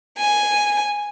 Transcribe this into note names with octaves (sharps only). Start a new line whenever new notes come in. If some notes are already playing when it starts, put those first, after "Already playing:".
G#5